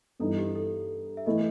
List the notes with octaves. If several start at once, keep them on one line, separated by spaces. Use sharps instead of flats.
G2 E3 B3 D#4 A4
G4
A4
E5
E3 A3 E4 D#5